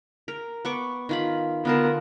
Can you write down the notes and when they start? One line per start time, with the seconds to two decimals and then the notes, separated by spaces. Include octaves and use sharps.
0.28 A#4
0.65 B3 C#6 D6
1.09 D#3 F4 B5
1.65 D3 B3 F4 A#4 A5